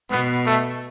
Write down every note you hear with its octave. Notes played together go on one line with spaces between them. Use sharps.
B2 B3
A3